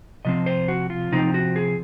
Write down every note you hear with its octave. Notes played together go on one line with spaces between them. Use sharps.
C3 F3 C4 D#5
C5
F#4
F4
C3 F3 C4 D#4
F#4
G#4